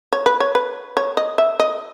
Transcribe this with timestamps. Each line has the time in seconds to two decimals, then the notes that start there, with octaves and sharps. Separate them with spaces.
0.13 C#5
0.26 B4
0.40 C#5
0.55 B4
0.97 C#5
1.17 D#5
1.38 E5
1.60 D#5